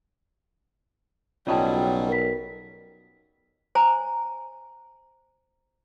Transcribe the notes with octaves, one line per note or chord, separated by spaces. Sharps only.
B1 C#3 F#3 G3 F4 D#5 G5 A5
A#4 B6
C5 G#5 A#5